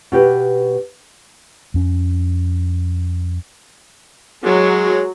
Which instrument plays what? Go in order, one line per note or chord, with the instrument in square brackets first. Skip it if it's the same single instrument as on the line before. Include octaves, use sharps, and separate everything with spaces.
[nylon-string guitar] B2 G4 B4
[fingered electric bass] F2 C#4
[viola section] F#3 [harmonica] G#3